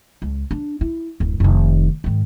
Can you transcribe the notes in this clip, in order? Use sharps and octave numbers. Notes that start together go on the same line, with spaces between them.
C#2
D4
E4
D1 F#2
F1 D#3
G#2 D#3